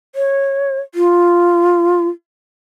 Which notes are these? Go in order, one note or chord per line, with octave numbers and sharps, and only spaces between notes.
C#5
F4